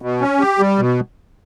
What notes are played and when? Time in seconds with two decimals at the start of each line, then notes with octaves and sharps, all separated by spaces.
0.02 B2
0.21 C#4
0.40 G4
0.59 G3
0.79 B2